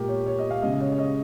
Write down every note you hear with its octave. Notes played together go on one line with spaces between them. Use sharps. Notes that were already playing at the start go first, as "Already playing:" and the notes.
Already playing: A#2 G#3 G4 A#4
C#5
C#5
D#5
F5
C#3 G#3 D#5
D#5
C#5
C#5
D#5